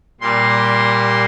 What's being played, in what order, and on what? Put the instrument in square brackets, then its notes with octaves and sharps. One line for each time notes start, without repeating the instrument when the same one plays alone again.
[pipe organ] A#2 G3 A#3 C6